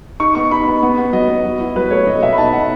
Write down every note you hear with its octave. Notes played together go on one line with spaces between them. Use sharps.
D#4 C#6
B3 C#6
D#4 B5
B3
B3
B3
F#3 D#5
B3
F#3
E4
F#3 B4
A3 C#5
B2 D#5
B2 E5
B5
D#4 A5
B2 F#5